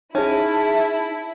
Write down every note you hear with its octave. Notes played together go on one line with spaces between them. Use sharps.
C#4 D#4 E4 G#4 A5